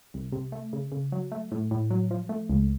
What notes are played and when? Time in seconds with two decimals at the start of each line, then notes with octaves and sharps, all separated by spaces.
0.14 C2
0.32 C3
0.52 A3
0.73 C#3
0.92 C#3
1.12 F#3
1.32 A3
1.52 A2
1.71 A2
1.90 F#3
2.11 F3
2.29 A3
2.50 C#2